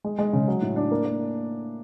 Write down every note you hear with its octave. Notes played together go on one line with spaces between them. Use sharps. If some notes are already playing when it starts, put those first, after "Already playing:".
G#3
G#3
C#3
F#3
A2
D4
A#3
A#3